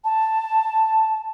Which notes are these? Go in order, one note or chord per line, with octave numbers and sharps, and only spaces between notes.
A5